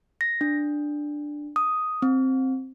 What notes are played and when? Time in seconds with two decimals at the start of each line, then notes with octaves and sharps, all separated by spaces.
0.21 A#6
0.41 D4
1.56 D#6
2.02 C4